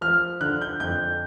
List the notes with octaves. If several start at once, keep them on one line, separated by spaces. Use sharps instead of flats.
F3 F6
D3 F#6
G6
F2 G6